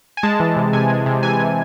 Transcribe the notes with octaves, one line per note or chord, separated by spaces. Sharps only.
G#5
G#3 A5
E3
C3
C3 G#5
G#3
C3
E3 G#5
C3